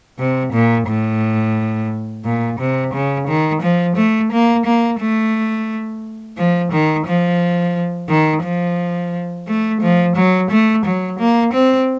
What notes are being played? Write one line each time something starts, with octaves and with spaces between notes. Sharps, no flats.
C3
A#2
A2
A#2
C3
C#3
D#3
F3
A3
A#3
A#3
A3
F3
D#3
F3
D#3
F3
A3
F3
F#3
A3
F#3
A#3
C4